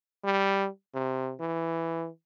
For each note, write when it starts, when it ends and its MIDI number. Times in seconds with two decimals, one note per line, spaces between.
0.25 0.68 55
0.95 1.34 48
1.40 2.08 52